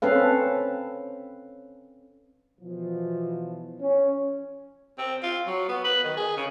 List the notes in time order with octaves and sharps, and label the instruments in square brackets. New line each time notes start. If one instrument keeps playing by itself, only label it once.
[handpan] C4 C#4 A4 B4 F5
[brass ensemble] B2 E3 F3
C#4
[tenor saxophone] C4
F4
F#3
B3
B4
D#3
G#4
C#3